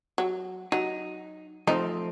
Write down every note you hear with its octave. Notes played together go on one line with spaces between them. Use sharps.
F#3
F#3 D#4
F3 A3 C4 D#4